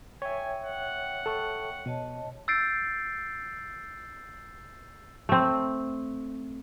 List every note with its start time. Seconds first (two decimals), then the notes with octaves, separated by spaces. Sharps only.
0.22 C#5 E5 G5 G#5
0.62 F#5
1.26 A4 C#6
1.86 B2 C#5 D#5 A5
2.48 E6 G6 A6 C7 D7
5.29 A3 C4